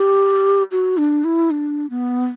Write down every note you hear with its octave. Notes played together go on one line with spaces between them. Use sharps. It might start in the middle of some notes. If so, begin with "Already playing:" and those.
Already playing: G4
F#4
D4
E4
D4
B3